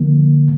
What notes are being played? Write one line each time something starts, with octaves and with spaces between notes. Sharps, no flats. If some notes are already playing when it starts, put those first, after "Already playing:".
Already playing: D3 F3 A#3